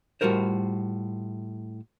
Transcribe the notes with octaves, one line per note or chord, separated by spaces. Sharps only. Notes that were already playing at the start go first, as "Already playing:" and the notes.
A2 G3 F4 F#4 A#4 C5